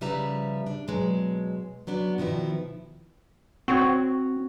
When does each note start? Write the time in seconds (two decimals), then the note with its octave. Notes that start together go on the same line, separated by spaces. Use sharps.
0.01 C#3 F3 G3 B4 E5 A#5
0.67 D4
0.88 B2 F#3 G#3
1.87 F#3 B3 D4
2.18 B2 D#3 F3 E4
3.68 C4 F#4 C#5